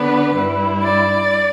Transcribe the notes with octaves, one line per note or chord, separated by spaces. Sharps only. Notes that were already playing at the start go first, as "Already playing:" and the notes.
Already playing: D3 B3 D4 B4
G2 G3 E4
D5